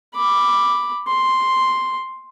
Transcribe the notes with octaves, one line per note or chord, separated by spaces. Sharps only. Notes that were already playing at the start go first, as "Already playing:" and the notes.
B5 D6
C6